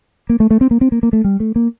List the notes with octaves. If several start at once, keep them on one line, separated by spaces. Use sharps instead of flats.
A#3
A3
A3
C4
A#3
C4
A#3
A#3
A3
G3
A3
A#3